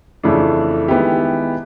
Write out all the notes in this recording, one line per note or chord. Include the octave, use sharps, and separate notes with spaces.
F2 C#3 E3 A3 D4
D#3 G#3 B3 E4 G4